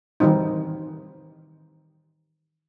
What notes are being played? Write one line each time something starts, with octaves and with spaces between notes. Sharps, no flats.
D#3 E3 G3 C4 D#4